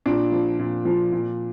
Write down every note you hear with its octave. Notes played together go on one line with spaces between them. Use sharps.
A#2 D4
F3
A#2
F3
A#2